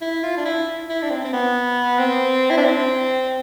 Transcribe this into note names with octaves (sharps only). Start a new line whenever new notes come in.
E4
F4
D4
E4
E4
D4
C4
C4
B3
C4
E4
D4
C4